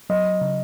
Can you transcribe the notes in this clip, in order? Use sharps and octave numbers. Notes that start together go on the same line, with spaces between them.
F#3 D#5
C#3